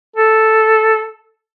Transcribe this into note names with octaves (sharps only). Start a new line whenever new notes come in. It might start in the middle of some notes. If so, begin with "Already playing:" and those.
A4